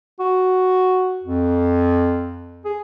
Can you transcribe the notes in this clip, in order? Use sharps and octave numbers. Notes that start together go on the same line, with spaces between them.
F#4
F2
G#4